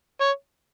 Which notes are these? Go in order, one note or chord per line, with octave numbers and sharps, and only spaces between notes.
C#5